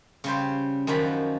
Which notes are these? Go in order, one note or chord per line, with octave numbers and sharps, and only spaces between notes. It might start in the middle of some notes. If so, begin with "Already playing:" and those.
C#3 G3 C5
F#2 D#3 F3 F#4 B5